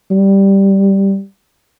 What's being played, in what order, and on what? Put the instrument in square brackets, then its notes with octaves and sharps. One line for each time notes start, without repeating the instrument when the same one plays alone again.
[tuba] G3